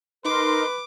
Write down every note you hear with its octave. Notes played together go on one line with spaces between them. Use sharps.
D#4 A#4 B4 C6 D6